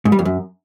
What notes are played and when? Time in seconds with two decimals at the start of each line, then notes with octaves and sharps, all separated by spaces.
0.05 G#2
0.12 G3
0.19 F2
0.25 F#2